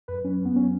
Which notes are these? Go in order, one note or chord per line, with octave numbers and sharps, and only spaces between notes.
F#2 B4
F#3 C#4
F#2 B3
F#3 C#4